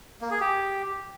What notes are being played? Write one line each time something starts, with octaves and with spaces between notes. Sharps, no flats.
A#3
G#4
G4